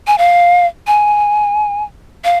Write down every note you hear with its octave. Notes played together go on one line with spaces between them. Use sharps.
G#5
F5
G#5
F5